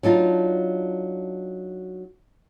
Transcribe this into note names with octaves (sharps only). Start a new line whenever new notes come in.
F#3 D4 D#4 F4